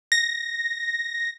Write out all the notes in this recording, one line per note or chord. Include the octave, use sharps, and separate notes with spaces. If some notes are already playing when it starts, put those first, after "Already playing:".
A#6